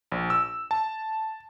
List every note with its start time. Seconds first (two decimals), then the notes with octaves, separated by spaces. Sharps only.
0.12 A#1
0.30 E6
0.71 A5